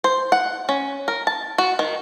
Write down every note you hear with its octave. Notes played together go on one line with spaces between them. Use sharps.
C5
F#5
C#4
A#4
A5
F#4
D#3